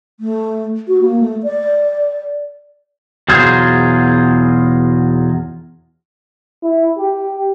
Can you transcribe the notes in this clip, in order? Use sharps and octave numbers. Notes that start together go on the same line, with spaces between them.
A3
F#4
A#3
A3
D5
E2 B2 F#3 F4 G#4 C5
E4
G4